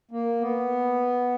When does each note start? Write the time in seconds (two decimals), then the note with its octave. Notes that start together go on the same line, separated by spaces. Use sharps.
0.11 A#3
0.41 B3